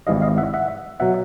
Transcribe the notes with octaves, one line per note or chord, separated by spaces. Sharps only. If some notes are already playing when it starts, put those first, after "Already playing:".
G#1 G#2 E3 G3 D#5 F5
D#5 F5
E5 F#5
E5 F#5
B2 F#3 E5 F#5